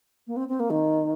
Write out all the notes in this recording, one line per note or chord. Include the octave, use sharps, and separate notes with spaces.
A#3
C4
C4
A#3
D#3